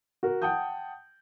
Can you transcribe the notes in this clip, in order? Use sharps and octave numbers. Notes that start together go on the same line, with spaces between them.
F#4 A#4
F#5 G5 A5 D#6 G6